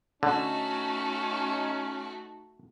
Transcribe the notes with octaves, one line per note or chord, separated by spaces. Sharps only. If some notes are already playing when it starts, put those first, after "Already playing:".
D3 A3 C#4 D#4 F#4